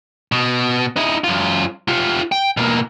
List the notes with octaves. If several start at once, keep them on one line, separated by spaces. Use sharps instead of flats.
B2
D#4 E4
F#2 F4
F4 G4
G5
B2 A#3